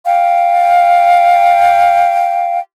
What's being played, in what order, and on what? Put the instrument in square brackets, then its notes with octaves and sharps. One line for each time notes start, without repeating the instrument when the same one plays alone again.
[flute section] F5 G5